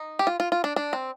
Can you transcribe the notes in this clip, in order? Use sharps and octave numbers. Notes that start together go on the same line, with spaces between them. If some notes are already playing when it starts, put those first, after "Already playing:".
Already playing: D#4
G4
F4
F4
F4
D4
D4
C4